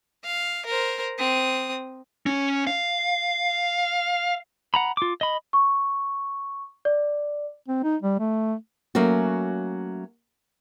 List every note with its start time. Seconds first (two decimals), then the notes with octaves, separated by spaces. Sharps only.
0.25 F5
0.66 A#4 C5
1.19 C4 D#6
2.26 C#4
2.67 F5
4.74 F#5 A#5 B5
4.97 F4 D6
5.21 D#5 B5
5.53 C#6
6.85 D5
7.68 C4
7.83 D#4
8.02 G3
8.19 A3
8.95 F#3 A3 A#3 C#4 F#4